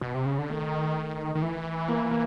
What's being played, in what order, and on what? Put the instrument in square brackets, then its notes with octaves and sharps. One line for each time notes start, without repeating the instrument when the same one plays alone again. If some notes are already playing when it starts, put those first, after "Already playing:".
[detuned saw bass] B2
C3
C#3
D3
[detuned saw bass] D#3 [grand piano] A3
[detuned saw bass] D#3
E3
[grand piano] A#3
A#3